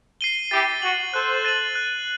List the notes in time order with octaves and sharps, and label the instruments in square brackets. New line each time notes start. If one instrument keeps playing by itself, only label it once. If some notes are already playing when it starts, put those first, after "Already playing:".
[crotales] C7 D#7 G7
[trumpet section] E4 G4 [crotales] A6
[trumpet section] F#4 [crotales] D#7 F#7
[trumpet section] A4 C5 [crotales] F#6
[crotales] A6 D#7 F#7
F#6